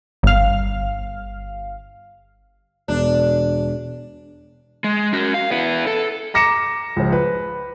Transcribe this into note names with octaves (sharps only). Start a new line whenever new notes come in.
G1 F5
E1 D4
G#3
C#4 F#4
F5
B3 E4
A4
A#5 D6 A#6 C#7 E7
C#2 F3
B4